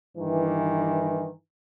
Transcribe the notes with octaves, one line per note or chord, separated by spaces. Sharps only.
G2 D#3 E3